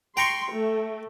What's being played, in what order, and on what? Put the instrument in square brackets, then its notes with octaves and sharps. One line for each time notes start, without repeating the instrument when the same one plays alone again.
[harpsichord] G5 A#5 C#6 [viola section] C6
[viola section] A3